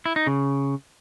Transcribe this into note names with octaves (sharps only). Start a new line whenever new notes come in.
E4
D#4
C#3